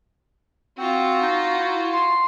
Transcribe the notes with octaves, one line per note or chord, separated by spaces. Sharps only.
C4 F4 F#4
D#4
E4
C6